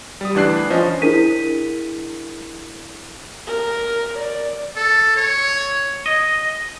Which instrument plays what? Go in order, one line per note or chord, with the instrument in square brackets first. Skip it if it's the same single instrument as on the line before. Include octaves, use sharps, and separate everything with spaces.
[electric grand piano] G3 D#6
D2 E3 D4 F#6 C7
F3 C#4 C5 D#5
[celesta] D4 E4 G#4 A#4 B6 D#7
[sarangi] A#4
D5
[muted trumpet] A4
C#5
[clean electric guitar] D#5